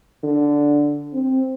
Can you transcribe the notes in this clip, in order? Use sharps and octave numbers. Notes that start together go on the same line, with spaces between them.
D3
C4